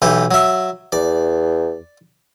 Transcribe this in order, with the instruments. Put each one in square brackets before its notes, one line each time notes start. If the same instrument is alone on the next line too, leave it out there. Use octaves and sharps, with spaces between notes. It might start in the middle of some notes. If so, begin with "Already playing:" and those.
[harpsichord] B1 E3 G4
F#3 E5
[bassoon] E2 [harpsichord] D5